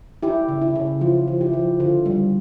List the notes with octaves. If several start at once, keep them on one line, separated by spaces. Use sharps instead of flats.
E4 G4
C#3
E4
C#3
F3 F4
F3
E4 G4
F3
D3 F4
G3